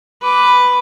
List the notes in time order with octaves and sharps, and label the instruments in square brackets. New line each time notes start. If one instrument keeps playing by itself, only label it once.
[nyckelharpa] B4 D6